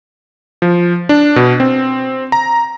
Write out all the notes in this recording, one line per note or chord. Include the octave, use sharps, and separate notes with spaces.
F3
D4
B2
C4
A#5